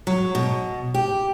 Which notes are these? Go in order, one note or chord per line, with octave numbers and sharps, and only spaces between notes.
F#3
B2
G4